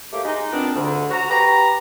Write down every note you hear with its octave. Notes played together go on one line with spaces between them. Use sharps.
A3 A#3 G4
G#3 D#4
A#2 B3 C4 D4
D2 G#2 D3
F#4 A#5
G4 B4 A#5